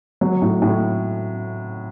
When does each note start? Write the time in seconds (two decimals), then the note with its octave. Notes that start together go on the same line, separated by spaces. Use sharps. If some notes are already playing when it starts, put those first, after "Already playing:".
0.21 F#3
0.42 A2
0.62 A2